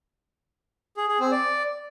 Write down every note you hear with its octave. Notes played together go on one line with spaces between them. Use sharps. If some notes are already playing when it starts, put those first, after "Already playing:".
G#4
G#4
C4
D5